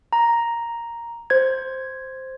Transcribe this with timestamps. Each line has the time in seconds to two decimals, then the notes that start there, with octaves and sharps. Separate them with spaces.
0.13 A#5
1.30 C5 G#6